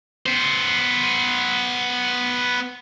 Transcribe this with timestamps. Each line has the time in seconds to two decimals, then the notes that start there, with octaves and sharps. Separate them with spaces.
0.26 B3 C5